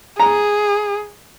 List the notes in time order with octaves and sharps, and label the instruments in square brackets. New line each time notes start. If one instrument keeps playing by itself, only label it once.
[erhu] G#4 [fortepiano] A#5